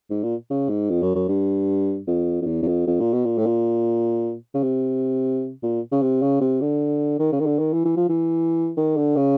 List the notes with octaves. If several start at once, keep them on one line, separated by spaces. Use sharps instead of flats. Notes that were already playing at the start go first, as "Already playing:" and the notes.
G#2
A#2
C#3
G#2
F2
F#2
F#2
G2
F2
F2
E2
E2
F2
F2
A#2
B2
A#2
A2
A#2
C#3
C3
A#2
C#3
C3
C#3
C3
D3
D#3
C#3
D#3
D3
D#3
E3
E3
F3
E3
D#3
D3
C#3